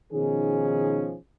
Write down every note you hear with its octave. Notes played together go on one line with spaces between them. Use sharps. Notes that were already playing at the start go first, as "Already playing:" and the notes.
B2 D#3 F3 C#4 D#4 G#4